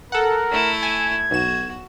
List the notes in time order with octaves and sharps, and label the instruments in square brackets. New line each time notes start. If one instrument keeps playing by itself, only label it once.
[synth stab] A4 F#5 [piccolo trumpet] A#4
[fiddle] A3 E4
[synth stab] G#5 [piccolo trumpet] G#6
[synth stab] B1 E7 [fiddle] F#4